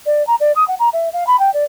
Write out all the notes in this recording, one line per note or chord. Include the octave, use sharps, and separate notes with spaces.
D5
A#5
D5
D#6
F#5
A#5
E5
F5
B5
G5
D5